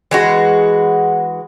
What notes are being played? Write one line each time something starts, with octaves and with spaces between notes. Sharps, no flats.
E3 G#3 F#4